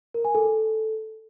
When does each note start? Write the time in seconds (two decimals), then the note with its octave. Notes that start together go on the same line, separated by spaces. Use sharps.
0.14 A#4
0.25 G#5
0.35 A4